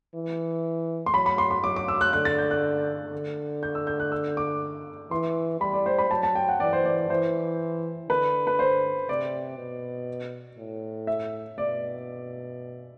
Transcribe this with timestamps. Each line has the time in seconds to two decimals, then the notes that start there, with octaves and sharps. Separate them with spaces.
0.15 E3
1.06 C6
1.14 F#3 B5
1.26 B5
1.38 C6
1.51 C6
1.64 F#3 D6
1.76 D6
1.88 E6
2.01 F#6
2.13 D3 F#6
2.25 A6
2.38 G6
2.51 F#6
3.12 D3
3.63 G6
3.75 E6
3.87 G6
4.00 F#6
4.12 E6
4.37 D6
5.11 E3 C6
5.61 G3 B5
5.73 D5
5.86 C5
5.99 B5
6.10 F#3 A5
6.23 A5
6.35 G5
6.49 F#5
6.60 E3 D5
6.73 C5
6.85 D5
7.10 E3 C5
8.09 D3 B4
8.47 B4
8.59 C5
9.09 C3 D5
9.58 B2
10.58 A2
11.07 E5
11.58 B2 D5